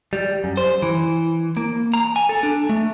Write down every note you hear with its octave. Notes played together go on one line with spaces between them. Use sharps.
G3
F#2
C5
E3
A#3
A#5
G#5
A4
D4
A3